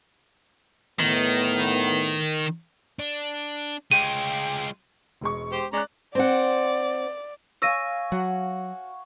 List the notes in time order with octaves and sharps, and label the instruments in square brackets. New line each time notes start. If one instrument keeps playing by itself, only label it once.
[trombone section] A2 B3 [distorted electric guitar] D#3
[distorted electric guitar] D4
[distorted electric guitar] G#3 F4 [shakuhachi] G5 [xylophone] D#7
[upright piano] E1 G#3 C#6
[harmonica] G4 C5
[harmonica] G#3 C#4 A#5 [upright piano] D5 F#6
[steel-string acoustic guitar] C4 C5 F#5 [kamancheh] D5
[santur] C#5 F5 G#5 [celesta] E6 A#6 D#7
[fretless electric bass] F#3 [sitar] F#4